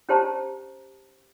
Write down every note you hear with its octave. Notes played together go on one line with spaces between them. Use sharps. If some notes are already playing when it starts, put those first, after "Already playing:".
C#4 G4 C5 A5 A#5